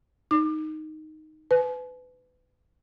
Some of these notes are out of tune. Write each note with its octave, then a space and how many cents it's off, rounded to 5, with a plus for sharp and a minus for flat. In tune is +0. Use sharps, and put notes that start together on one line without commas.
D#4 +0 D6 +30
B4 +25 G#5 +45